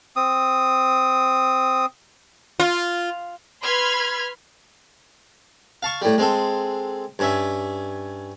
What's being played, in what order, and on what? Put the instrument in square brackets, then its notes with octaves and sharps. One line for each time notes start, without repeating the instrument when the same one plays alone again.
[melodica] C4 D#6
[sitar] F4
[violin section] B4 B5 C6 F6 G#6
[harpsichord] F5 A5 C#6
A2 G3
G#3 C4 A4
G2 C#4 E5